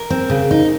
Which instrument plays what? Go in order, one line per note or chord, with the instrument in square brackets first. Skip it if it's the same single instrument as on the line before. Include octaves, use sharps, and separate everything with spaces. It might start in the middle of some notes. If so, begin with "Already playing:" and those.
Already playing: [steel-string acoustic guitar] A#4
C4
C#3
D#4